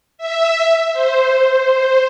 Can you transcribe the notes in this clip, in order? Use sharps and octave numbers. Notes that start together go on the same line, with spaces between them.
E5
C5